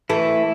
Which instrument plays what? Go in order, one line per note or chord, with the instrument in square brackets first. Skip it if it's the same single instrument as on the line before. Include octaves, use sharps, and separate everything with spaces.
[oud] E3 A3 [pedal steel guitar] E4